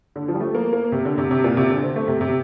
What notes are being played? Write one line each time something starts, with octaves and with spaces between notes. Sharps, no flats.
D3
F3
G3
A3
A#3
A#3
C3
D3
C3
C3
A#2
C3
D3
C4
A3
C3
C3